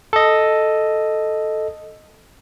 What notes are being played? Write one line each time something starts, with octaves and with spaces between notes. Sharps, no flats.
A4 D#5